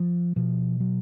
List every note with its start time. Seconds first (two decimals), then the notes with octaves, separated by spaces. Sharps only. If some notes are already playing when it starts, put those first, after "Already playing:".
Already playing: F3
0.36 B2 F3
0.80 F#3